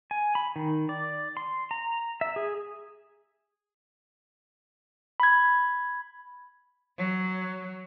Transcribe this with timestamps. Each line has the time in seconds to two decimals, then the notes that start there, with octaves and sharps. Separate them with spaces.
0.11 G#5
0.35 B5
0.56 D#3
0.89 D5
1.37 C6
1.71 A#5
2.21 E5
2.36 G#4
5.20 B5 G#6
6.99 F#3